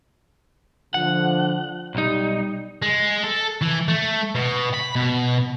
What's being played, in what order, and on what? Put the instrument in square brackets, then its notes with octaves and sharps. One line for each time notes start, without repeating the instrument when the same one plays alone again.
[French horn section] D3 F3 [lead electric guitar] F#5
[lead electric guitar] B1 D#4 [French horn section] G3
[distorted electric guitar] G#3
A4
E3
A3
B2
B5
B2